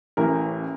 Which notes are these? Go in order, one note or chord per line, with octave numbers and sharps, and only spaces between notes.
A1 A2 E3 A#4